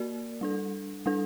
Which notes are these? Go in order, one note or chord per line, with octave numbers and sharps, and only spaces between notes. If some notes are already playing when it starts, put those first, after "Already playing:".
Already playing: A#3 F#4 A#4 D5
G3 D4 A4
G3 D4 A4